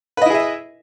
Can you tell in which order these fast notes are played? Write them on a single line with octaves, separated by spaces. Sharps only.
B4 D#5 E4 G#4 E5